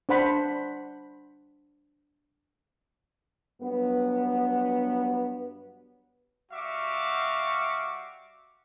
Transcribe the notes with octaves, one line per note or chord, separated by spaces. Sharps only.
D4 C5 F#5 B5
G2 F#3 B3
G3 F#4 E5 F5 C#6 D6